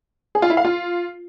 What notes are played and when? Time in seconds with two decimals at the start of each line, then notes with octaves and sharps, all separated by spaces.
0.35 G#4
0.42 F4
0.50 E4
0.57 F5
0.65 F4